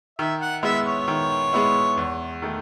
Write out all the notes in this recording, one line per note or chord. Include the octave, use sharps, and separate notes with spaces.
D#3 E5
F#5
G#3 B3 E4 E5
C#5
D#3
G#3 B3 E4
E2
D#3 A3 D#4